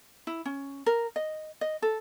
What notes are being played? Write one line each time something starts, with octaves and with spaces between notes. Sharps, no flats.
E4
C#4
A#4
D#5
D#5
A4